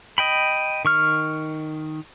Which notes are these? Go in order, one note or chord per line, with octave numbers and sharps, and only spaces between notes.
D#5 G5 B5
D#3 C#6 F6